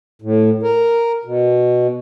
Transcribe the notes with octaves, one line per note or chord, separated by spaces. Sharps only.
A2
A#4
B2